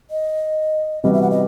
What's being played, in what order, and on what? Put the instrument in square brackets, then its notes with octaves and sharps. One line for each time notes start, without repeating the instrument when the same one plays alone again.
[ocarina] D#5
[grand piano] C3 E3 G3 B3 F#4 [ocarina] D#5
[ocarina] E5
F#5
D#5